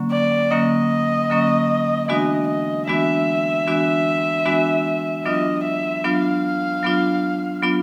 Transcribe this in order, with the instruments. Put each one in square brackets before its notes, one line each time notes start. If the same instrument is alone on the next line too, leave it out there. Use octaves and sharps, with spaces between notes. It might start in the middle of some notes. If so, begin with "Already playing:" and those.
Already playing: [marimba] D3 F#3 A#3 C#4
[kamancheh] D5
[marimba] D3 F#3 A#3 C#4 [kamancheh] D#5
[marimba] D3 F#3 A#3 C#4
[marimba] E3 G#3 B3 D4 F#4 [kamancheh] D#5
[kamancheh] D#5
[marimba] E3 G#3 B3 D4 F#4 [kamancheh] E5
[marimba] E3 G#3 B3 D4 F#4
E3 G#3 B3 D4 F#4
[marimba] F#3 B3 D4 F4 [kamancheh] D#5
[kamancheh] E5
[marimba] F#3 B3 D4 F4 [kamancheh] F5
[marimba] F#3 B3 D4 F4
F#3 B3 D4 F4